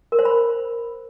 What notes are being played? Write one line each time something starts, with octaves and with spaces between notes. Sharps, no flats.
A#4
C5
B5